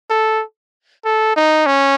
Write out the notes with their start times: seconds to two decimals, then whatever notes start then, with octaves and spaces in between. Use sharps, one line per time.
0.10 A4
1.05 A4
1.36 D#4
1.66 C#4